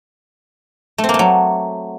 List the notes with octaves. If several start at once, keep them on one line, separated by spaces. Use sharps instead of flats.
A3
C4
A#3
A3
F#3